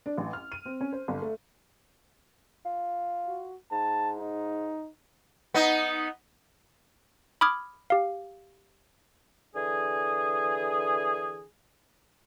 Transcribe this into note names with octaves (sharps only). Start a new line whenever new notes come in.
D4
A1
F6
D#7
C4
C#4
C5
G1
A3
F4
F#4
G#2 A5
D#4
B3 D#4
B5 D6 D#6 F6 G#6
G4 F5
D3 E3 G#4